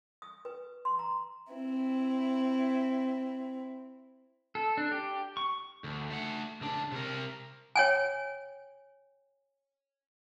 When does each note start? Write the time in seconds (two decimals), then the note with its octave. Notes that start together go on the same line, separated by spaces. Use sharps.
0.22 D#6
0.45 B4
0.85 C6
0.99 A#5
1.52 C4 E4
4.55 A4
4.77 D4
4.92 G4
5.37 C#6
5.84 D2
6.10 A3 F#5
6.61 C#2 D4
6.92 C3 A#4
7.76 C#5 G5 G#5